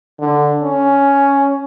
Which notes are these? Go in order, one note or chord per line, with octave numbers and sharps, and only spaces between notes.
D3
C#4